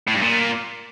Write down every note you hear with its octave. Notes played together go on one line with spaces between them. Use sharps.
A2
G2
A#2